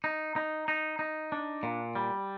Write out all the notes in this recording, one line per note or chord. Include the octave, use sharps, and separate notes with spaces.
D#4
D#4
D#4
D#4
D4
A#2
G3